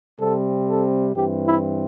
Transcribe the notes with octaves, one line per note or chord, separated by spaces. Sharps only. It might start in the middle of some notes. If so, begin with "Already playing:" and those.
C3 G3 C4 A4
A4
G2 E3 C4 G4
E4